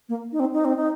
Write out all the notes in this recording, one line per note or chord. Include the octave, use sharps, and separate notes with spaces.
A#3
D#4
C4
D#4
C4
D#4